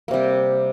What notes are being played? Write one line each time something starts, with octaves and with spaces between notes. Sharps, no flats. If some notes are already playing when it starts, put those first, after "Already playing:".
C3 G3 A#3